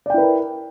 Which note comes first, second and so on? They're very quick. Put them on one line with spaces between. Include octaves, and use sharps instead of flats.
D5 G5 E4 B4 A#4